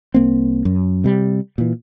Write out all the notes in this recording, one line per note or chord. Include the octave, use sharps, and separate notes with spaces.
C2 A#3 C4
F#2
C3 G3
A#2 E3